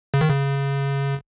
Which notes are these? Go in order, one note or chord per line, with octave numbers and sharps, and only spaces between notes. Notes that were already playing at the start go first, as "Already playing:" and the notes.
C#3
D#3
C#3